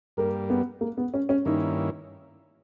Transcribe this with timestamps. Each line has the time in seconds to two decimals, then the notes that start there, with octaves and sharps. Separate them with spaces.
0.17 G2 G3 A#3 A#4
0.50 B3
0.81 A#3
0.98 B3
1.14 C#4
1.29 C#4
1.45 G2 D#3 A#3 C#4 D#4 E4